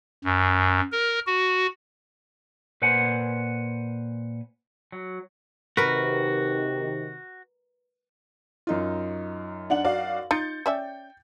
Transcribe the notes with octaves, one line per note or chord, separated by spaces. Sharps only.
F#2
A#4
F#4
A#2 B4 C5 F#5 G#5
F#3
C3 D#3 F#4 A#4 B4
F#2 D#4 F4
D4 F#5 F#7
F#4 D5 F5
D#4 F4 G6 A6 C#7
C#4 D5 E5 G5